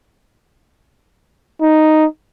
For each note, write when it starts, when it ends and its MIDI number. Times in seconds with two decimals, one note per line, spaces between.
1.62 2.05 63